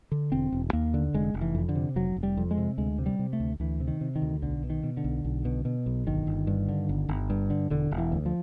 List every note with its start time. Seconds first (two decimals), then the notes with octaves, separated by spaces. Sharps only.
0.11 D3
0.32 E1 C4
0.52 E1
0.73 D#2 A#3
0.94 D3
1.14 F1 G#3
1.34 F1
1.41 E3
1.55 F2
1.69 D3
1.75 C3
1.96 F1 F#3
2.16 F1
2.23 G3
2.37 F2
2.51 G#3
2.57 C3
2.78 D2 G#3
2.98 C3
3.06 G3
3.19 C3
3.33 A3
3.40 D2
3.60 D2 E3
3.80 C3
3.88 D#3
4.01 C3
4.16 D#3
4.22 D2
4.42 B1 D3
4.63 B2
4.70 D#3
4.83 B2
4.97 D3
5.04 B1
5.24 B1
5.45 B2
5.65 B2
5.86 B1
6.06 G1 D#3
6.27 G1
6.47 G2
6.68 D3
6.89 G1
7.09 G1
7.30 G2
7.50 D3
7.70 E1 D3
7.91 E1
7.98 E3
8.12 D2
8.26 F3